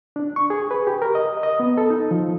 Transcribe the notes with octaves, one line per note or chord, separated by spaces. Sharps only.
D4
C#6
G#4
B4
G4
A#4
D#5
D#5
B3
A4
D#4
F3